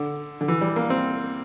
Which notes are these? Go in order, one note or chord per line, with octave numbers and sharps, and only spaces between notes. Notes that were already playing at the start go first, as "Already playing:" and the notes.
Already playing: D3
D3
E3
G3
A#3
C4